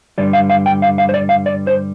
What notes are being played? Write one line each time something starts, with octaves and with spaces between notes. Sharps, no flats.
G2 D3 G3 D5
F5
F5
G5
F5
F5
C5
D5
F5
D5
C5